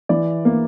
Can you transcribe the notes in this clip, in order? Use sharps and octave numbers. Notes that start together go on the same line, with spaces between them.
E3 D5
A#3